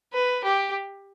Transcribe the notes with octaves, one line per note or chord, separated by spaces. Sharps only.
B4
G4